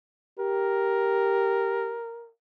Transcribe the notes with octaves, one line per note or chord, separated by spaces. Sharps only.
G4 A#4